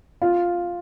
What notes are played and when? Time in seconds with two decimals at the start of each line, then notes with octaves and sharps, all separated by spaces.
0.22 F4